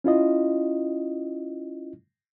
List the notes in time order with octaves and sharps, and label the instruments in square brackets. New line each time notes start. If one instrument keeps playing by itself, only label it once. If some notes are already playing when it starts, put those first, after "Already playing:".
[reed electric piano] C#4 E4 F4 D#5